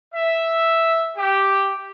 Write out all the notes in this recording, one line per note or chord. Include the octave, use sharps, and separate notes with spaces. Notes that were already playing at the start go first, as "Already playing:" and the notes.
E5
G4